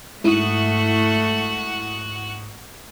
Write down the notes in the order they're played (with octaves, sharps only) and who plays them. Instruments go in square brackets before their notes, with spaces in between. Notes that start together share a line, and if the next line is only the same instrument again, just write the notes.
[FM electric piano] G#2 D#6 [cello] A3 [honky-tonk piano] E4 D#7 [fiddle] F#4 F#5